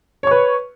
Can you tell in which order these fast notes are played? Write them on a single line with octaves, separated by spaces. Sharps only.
C#5 C#6 B4